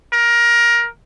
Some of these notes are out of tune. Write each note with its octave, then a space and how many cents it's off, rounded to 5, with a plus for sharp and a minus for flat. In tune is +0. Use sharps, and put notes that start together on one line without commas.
A#4 +20